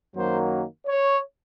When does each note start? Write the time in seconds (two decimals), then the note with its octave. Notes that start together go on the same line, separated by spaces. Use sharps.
0.15 F#2 D#3 F#3 A#3 C5
0.86 C#5